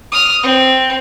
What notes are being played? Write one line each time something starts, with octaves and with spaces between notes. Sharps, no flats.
D#6 F6
C4